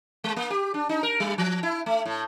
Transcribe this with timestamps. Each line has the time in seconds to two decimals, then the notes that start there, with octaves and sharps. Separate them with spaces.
0.24 G#3
0.36 A#3
0.50 G4
0.74 D4
0.89 D#4
1.03 A#4
1.20 G3
1.38 F3
1.63 E4
1.86 A3
2.06 A2